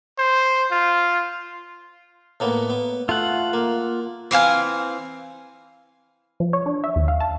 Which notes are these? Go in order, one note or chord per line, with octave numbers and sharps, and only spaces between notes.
C5
F4
A2 A#3 B3
B3
A3 F4 F#5
A#3
E3 C4 F5 G#5
F3
C#5
D4
E5
D#2
F5
A5